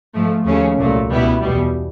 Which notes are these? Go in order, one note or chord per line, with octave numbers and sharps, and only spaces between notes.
G#2 F3 A3
D#2 C#3 F3 A3 C#4
C2 A#2 F#3 A3
C#2 B2 G3 B3 E4
E2 B2 G3